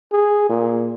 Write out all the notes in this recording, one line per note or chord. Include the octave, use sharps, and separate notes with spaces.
G#4
A#2